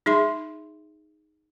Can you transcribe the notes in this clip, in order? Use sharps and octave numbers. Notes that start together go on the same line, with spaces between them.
D#4 G#4 E5 C6